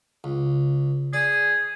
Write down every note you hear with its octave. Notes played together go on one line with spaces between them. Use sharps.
C#2
G#4 D5